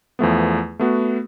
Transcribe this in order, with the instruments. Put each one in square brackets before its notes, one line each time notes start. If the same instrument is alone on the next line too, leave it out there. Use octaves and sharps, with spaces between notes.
[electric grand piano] E2 F3 A3 B3
A3 B3 F#4